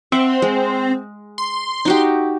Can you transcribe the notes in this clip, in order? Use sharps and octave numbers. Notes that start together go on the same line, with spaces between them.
C4 E5 F#5
G#3
C6
D#4 F#4 G4